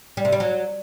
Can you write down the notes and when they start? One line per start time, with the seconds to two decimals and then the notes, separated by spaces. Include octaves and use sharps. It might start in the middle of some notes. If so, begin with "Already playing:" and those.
0.17 G3
0.25 C3
0.32 G3
0.40 F#3